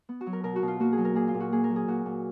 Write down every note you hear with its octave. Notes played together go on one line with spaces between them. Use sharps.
B3
F#4
F#3
A#4
B2 A#4
F#4
B2
F4
A#3 F#4
G#4
F#3
A#4
A#2 G#4
F4
A#2
F#4
A#3 G#4
A#4
F#3
G#4
A#2 F#4
A#2